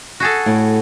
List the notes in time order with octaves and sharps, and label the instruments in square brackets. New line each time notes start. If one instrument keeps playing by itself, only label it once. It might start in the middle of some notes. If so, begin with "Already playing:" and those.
[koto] F#4 G#4 A4
[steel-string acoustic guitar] A2